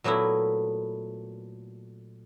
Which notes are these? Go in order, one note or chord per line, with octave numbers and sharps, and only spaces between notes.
A#2 F#3 A3 B3 E4